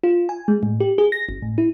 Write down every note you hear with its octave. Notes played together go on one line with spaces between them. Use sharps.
F4
G#5
G#3
A2
G4
G#4
A#6
G1
A2
E4